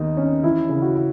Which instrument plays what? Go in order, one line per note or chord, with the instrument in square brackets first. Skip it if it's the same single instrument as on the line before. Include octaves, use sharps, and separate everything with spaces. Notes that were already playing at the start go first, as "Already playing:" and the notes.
Already playing: [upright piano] D#2 D#3 B3 [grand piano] D#4
[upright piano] C#4
[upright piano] E3 [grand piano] E4
[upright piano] C#3
[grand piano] F#4
[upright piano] E4